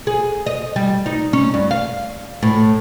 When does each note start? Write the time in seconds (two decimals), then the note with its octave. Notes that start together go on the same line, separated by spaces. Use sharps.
0.07 G#4
0.46 D#5
0.76 G3
1.06 D#4
1.33 C#4
1.54 G2
1.71 F5
2.43 A2